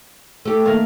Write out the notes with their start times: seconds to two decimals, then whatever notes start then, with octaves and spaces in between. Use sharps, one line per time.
0.45 A3 G4 A4
0.65 D#3 A3 A#3 A#4